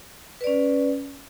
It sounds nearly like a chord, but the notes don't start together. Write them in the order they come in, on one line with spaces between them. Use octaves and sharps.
B4 D5 C#4